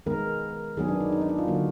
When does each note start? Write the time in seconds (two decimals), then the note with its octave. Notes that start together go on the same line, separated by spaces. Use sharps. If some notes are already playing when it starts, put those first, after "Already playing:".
0.06 D#3 G#3 B3 A#4
0.77 D#3 F#3 B3 G#4
0.88 D4
1.00 D#4
1.12 D#4
1.21 D4
1.29 D#4
1.39 F4
1.48 D3 F#3 A#3 F#4